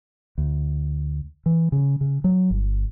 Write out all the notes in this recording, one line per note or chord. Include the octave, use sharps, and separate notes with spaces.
D2
E3
C#3
C#3
F#3
G1